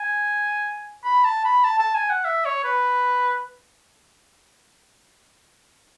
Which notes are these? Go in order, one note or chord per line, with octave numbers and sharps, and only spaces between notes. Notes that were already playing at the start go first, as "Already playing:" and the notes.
Already playing: G#5
B5
A5
B5
A5
A5
G#5
F#5
E5
C#5
B4